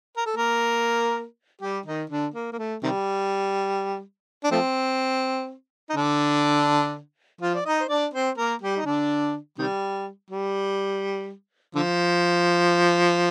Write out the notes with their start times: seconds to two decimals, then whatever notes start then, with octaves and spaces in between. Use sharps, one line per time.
0.17 A#4
0.26 A4
0.37 A#3 A#4
1.62 G3 G4
1.86 D#3 D#4
2.10 D3 D4
2.34 A#3
2.53 A#3
2.59 A3
2.83 C3 D#3 G3
4.44 D4
4.51 F3 A3 C4
5.90 D#4
5.96 D3 D4
7.41 F3 F4
7.55 D5
7.65 D#4 D#5
7.80 C5
7.89 D4 D5
8.13 C4 C5
8.38 A#3 A#4
8.62 G3 G4
8.77 D#4
8.86 D3 D4
9.58 C3 D#3 G3
10.31 G3
11.75 D3 F3